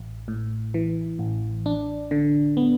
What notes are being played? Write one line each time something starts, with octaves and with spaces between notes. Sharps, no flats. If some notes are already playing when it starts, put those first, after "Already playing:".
Already playing: A1
A2
E3
A1
D4
D3
B3